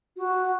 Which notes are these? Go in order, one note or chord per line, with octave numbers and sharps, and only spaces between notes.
F#4